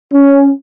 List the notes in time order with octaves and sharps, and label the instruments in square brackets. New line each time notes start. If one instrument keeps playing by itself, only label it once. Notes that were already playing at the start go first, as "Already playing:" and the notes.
[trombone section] C#4